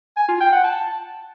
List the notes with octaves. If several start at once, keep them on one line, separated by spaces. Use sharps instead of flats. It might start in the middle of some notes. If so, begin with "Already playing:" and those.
G#5
F4
G5
F#5
A5